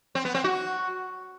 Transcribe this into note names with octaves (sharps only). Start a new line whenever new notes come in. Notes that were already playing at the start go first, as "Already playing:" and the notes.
C4
B3
C4
F#4